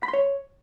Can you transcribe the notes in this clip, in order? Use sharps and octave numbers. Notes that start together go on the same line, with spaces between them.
B5
C6
C#5